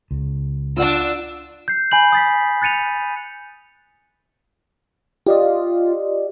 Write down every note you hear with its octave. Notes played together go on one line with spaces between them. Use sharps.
C#2
D4 F4 D5 F#5 E6
G6 C7
G#5 B5 G6 F#7
D#6 A6 B6
F#6 A6 C#7 D#7 F7
F4 G4 D5 D#5